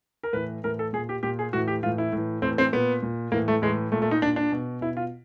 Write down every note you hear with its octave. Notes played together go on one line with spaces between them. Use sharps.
A#4
A2 E3 B4
A2 E3 A#4
A4
A#2 G#4
G4
A#2 G4
G#4
A2 E3 F#4
G4
A2 E3 F4
E4
A2 E3
A2 E3 C4
C4
A#2 B3
A#2
A2 E3 A#3
A3
A2 E3 G#3
A#2 A3
A3
D#4
A#2 D4
D4
B2
B2 E4
F4